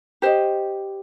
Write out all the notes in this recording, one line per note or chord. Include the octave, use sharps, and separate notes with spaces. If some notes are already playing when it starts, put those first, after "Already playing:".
G4 C5 D#5